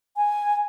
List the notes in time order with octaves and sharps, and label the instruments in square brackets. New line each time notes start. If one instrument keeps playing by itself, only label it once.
[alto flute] G#5